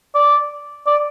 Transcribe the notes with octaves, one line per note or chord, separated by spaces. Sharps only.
D5
D5